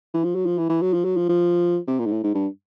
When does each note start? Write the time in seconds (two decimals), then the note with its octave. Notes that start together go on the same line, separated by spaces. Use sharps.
0.14 E3
0.24 F3
0.35 F#3
0.46 F3
0.58 E3
0.69 E3
0.82 F#3
0.93 F3
1.04 F#3
1.17 F3
1.29 F3
1.87 C3
1.99 A#2
2.06 G#2
2.11 A2
2.23 G#2
2.34 G2